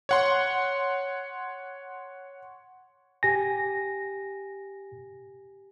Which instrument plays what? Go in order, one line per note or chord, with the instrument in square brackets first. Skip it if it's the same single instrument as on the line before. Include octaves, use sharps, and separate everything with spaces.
[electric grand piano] C#5 F#5 C6
[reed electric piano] G4 G#5 [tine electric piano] A#6